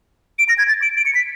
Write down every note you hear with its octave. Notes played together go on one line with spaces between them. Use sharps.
D7
A#6
G#6
A6
D7
D7
C#7
B6